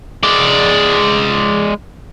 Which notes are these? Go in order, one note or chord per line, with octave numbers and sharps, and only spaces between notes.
G#3 D5